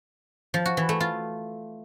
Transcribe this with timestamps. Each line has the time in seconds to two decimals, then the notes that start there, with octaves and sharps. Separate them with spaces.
0.54 F3
0.66 F#4
0.77 E3
0.89 A3
1.00 F4